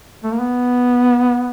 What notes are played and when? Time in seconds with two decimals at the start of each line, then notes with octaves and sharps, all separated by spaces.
0.24 A3
0.32 A#3
0.39 B3